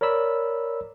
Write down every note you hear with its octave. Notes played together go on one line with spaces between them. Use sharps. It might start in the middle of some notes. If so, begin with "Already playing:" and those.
A#4 C#5 D5 B5 E6